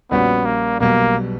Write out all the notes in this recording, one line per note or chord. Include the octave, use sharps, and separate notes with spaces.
A#1 A#2 G3 B3 C#4 F#4
A#3
B1 B2 G3 A#3